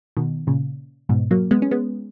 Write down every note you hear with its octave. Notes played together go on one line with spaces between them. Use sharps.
B2 D#3
A#2 C#3
G#2 B2
F#3 A#3
G#3 B3
C#4
G#3 B3